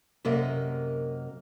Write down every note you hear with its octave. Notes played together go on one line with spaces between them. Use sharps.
F#2 C3 A#3 D#5